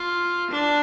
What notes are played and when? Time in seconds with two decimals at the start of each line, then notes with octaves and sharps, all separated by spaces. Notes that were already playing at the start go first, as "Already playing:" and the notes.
Already playing: F4
0.50 D4